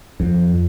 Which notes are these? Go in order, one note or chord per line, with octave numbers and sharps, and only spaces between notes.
F2